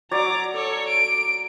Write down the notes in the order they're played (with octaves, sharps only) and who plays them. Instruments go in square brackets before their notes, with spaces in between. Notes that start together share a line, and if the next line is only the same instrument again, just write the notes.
[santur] F#3 D5 [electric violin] A#5 D6
[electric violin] A4 C#5
D7